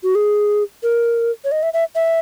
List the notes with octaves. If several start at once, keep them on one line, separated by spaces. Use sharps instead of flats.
F#4
G#4
A#4
C#5
D#5
E5
E5
E5